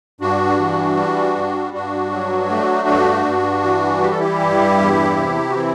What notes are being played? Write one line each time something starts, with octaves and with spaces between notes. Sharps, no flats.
G2 D4 F#4
E3
G3
G2
G2 D4 F#4
F#3
A3
G2
G2
E3
G3 G4
A4
E4 G4
G2
E2
C3
F#4
E3 C4 E4